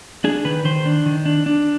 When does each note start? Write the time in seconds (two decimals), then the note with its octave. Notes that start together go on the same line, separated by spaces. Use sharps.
0.24 D4 G#4
0.45 D#3 B4
0.65 D#3 C5
0.85 D4
1.06 D#3
1.26 D4
1.46 D4